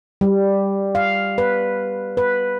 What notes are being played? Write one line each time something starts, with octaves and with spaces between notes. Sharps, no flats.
G3
F5
B4
B4